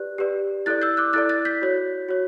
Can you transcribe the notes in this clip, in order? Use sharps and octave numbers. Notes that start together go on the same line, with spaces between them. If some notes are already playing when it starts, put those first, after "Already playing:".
Already playing: G4 B4 D5 F#6
G4 B4 D5
E4 A4 D5 F#6 A6
E6 G6
D6 F#6
E4 A4 D5 F#6 A6
F#6 A6
G6 B6
F#4 C#5
F#4 C#5